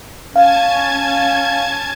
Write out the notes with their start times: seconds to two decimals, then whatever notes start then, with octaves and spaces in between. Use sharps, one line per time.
0.36 C#4 F5 G#5 A5 G#6